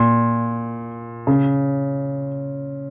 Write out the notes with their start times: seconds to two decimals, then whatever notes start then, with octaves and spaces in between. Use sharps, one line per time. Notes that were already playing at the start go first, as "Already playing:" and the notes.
Already playing: A#2
1.27 C#3